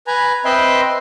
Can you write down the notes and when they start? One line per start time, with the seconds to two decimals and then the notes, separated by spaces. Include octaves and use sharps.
0.07 B4 G#5 A#5
0.45 C4 B4 D#5 E5 G5 C6